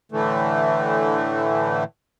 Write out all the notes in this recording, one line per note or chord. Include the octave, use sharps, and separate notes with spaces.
A2 D3 E3 A3